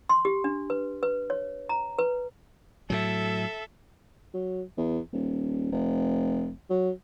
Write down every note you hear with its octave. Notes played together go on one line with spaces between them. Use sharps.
C6
G4
D4
B4
B4
C#5
A#5
B4
A2 F#3 A4 E5
F#3
E2
D#1
F1
F#3